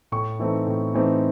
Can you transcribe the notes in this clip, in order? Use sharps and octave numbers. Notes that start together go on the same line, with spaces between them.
A2 C#6
E3 A3 C4 D#4
A2
E3 A3 C4 D#4